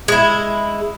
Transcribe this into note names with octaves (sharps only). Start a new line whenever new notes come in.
G#3 E4